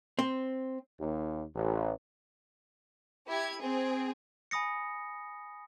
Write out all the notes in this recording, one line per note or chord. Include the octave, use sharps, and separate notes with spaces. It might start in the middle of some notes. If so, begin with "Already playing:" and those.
C4
D#2
A1
E4 G4 G#6
C4 G#4
G#5 B5 D#6 A#6 C#7